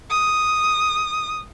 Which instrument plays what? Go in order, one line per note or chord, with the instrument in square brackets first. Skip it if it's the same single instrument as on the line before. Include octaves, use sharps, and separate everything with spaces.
[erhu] D#6